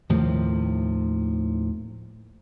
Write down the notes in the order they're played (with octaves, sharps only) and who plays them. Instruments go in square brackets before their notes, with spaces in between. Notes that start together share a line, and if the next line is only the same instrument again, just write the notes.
[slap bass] D#2 A2 C3 F3